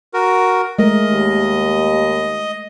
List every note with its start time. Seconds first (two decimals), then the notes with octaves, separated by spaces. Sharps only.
0.14 F#4 A#4
0.79 G#3 A3 A#4 D#5
1.10 D#2